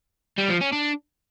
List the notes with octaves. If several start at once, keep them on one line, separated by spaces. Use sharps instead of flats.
G3
F3
C#4
D4